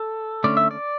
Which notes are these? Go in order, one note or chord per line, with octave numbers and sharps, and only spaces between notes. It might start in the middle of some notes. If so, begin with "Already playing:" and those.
Already playing: A4
D3 A3 C#4 D5
E5
D5